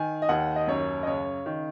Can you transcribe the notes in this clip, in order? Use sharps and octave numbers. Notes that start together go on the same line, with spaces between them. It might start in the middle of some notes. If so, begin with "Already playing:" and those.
Already playing: D#3 G#5
D#5
D#2 F#5
D#5
F#2 C#5
D#5
C#3 C#5
D#3